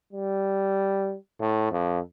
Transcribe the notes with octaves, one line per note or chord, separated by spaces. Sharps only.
G3
A2
F2